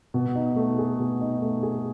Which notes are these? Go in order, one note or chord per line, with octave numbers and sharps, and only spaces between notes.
B2
D#4
A3
G#4
B2
D#4
A3
G#4